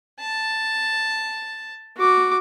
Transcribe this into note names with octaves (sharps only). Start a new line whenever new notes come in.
A5
F#4 D6